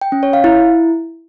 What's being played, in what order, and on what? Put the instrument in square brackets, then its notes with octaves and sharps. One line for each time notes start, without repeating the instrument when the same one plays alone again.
[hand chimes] G5
C#4
C#5
F5
E4